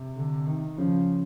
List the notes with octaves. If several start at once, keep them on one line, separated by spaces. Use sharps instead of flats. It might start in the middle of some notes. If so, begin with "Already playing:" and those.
Already playing: C3
D3
D#3
C#3 F3